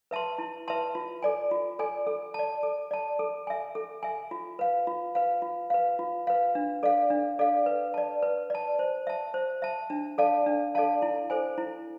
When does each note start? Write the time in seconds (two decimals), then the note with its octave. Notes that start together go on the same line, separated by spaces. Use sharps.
0.11 B4 E5 A5 C6
0.38 E4
0.68 B4 E5 A5 C6
0.95 F4
1.23 A4 D5 G#5
1.51 F4
1.79 A4 D5 G#5
2.07 A4
2.34 D5 A5
2.63 A4
2.91 D5 A5
3.19 A4
3.47 E5 G#5
3.75 A4
4.03 E5 G#5
4.31 F4
4.59 B4 F5
4.87 F4
5.15 B4 F5
5.42 F4
5.70 B4 F5
5.99 F4
6.27 B4 F5
6.55 D4
6.83 A4 D5 F5
7.10 D4
7.39 A4 D5 F5
7.66 B4
7.94 D5 A5
8.22 B4
8.50 D5 A5
8.79 C5
9.07 E5 A5
9.34 C5
9.62 E5 A5
9.90 D4
10.18 A4 D5 F5 A5
10.46 D4
10.75 A4 D5 F5 A5
11.02 E4
11.30 A4 C5 G#5
11.58 E4